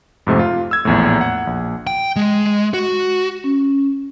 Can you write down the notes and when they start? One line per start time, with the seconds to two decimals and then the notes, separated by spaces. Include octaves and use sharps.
0.27 F2 G#2 C3 A3
0.39 F4
0.71 E6 G#6
0.85 A#1 E2 A2
1.21 F#5
1.47 A#1
1.87 G5
2.16 G#3
2.74 F#4
3.44 C#4